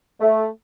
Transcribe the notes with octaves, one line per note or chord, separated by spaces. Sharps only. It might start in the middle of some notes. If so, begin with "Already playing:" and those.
A3